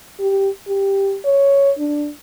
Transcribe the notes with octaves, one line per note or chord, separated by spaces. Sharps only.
G4
G4
C#5
D4